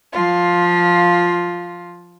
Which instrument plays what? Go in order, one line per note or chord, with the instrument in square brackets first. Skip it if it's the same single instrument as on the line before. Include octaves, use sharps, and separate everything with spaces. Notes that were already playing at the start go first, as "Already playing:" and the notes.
[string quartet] F3 F4